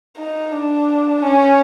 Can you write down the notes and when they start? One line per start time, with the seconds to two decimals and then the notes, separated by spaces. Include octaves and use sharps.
0.17 D#4
0.52 D4
1.22 C#4